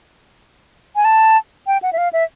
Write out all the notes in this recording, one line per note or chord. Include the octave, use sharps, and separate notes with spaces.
G#5
A5
G5
F#5
E5
F5
E5